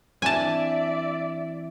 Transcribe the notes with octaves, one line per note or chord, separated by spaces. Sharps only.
E3 C4 D4 D5 E5 G#5 A5